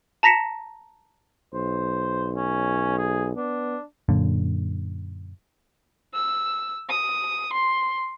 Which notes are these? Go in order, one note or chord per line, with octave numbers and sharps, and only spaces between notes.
A5 A#5 A#6 B6 C#7 E7
B1 C5
C#4
G#4
B3 D4
F#2 A#2 D3
E6
D#6
C6